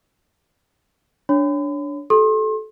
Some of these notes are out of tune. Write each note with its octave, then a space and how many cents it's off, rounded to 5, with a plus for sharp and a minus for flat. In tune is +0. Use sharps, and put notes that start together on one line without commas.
D4 -10 C#5 +0 B5 +40
F#4 +40 A4 -25 C6 +35